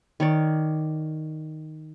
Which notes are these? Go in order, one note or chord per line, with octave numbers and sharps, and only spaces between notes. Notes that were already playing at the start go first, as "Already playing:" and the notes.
D#3 C#5 D5